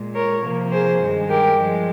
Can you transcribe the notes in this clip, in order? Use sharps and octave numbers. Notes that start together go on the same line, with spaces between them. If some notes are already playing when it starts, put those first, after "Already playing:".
Already playing: A#2 G#3
A#4 C#5
C3 F3 A#3
G#4 C5
G2 D#3 G#3
G4 A#4
G2 F3 G#3